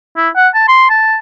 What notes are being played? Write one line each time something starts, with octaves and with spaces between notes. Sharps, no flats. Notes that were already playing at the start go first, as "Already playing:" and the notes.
E4
F#5
A5
C6
A5